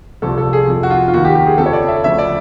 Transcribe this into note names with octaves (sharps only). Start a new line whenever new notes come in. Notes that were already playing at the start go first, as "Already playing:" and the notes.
C2 A#2 F3 A4
A4
G#4
F2 C3 F3
F#4
F4
F4
D#2 D#3 F#4
G4
G4
G#4
F2 C#3 F3 A4
C#5
D5
E5
D2 C#3 F3 E5
D5